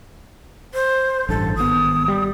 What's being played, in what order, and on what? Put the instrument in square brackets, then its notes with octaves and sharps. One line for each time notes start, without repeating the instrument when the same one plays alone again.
[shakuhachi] C5
[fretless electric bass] A1 G2 [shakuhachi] A4
[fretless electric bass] G#1 B3 [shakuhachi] D#6
[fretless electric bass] G3